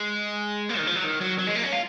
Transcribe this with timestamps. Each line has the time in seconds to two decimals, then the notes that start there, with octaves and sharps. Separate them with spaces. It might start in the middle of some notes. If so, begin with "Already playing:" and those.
Already playing: G#3
0.69 A#3
0.78 D#3
0.87 F3
0.95 F#3
1.04 D#3
1.20 F#3
1.38 F#3
1.47 G#3
1.55 A#3
1.63 C#4
1.72 F4